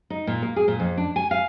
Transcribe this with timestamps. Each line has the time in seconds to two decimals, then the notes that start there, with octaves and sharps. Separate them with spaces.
0.10 D#4
0.27 A#2
0.42 A#3
0.56 G#4
0.68 A#2
0.80 F2
0.97 D4
1.16 G#5
1.31 F5